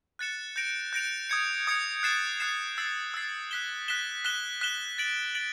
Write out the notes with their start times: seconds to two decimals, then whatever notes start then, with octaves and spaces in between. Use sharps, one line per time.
0.19 F#6 A6 C#7 E7
0.56 G6 A#6 D7 F7
0.93 G6 A#6 D7 F7
1.29 D#6 G#6 C#7
1.67 D#6 G#6 C#7
2.03 F#6 A6 C7 E7
2.40 F#6 A6 C7 E7
2.78 E6 A6 C7
3.14 E6 A6 C7
3.51 F#6 B6 E7 G7
3.88 F#6 B6 E7 G7
4.24 F#6 B6 E7 G7
4.61 F#6 B6 E7 G7
4.98 A6 D7 F#7
5.35 A6 D7 F#7